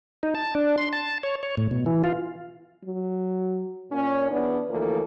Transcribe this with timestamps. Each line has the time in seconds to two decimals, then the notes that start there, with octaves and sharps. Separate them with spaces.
0.23 D#4
0.35 A5
0.55 D4
0.78 C6
0.93 A5
1.23 C#5
1.43 C#5
1.57 A2
1.71 B2
1.86 E3
2.04 F4
2.85 F#3
3.91 A#2 C#4
4.30 E2 B3 D4
4.70 D2 E3 F3 A#3 A4